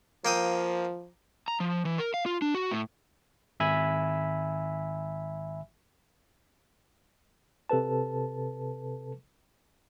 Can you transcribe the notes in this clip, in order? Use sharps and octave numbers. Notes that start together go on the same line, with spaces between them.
F3 A#3 G5 D#6
A#5
F3
E3
A#4
F5
F4
D4
F#4
A2
G#1 E5 G#5 B5
C3 A4 B4 A5